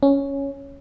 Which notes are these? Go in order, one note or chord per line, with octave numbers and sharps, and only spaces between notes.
C#4